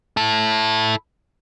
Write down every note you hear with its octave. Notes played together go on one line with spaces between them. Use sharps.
E4 A4